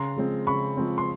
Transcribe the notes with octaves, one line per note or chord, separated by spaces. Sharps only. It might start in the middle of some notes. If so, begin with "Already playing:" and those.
Already playing: C#3 A#5 C6
F3 G#3 C4
C#3 B5 C#6
F3 G#3 C4
C6